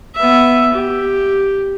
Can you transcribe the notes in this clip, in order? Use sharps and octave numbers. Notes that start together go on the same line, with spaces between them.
B3 E5
G4